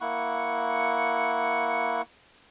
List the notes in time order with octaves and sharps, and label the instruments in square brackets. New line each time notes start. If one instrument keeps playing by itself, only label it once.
[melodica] A#3 E4 F#5 C#6